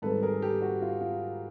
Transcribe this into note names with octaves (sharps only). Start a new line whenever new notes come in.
G#2 D#3 G3 C4 A4 B4
G#4 A#4
G4 A4
F#4
F4
F4